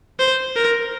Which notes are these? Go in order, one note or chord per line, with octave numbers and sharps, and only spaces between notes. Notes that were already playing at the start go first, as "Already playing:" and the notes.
C5
A#4